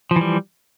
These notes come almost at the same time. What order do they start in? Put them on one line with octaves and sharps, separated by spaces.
F3 E3 G3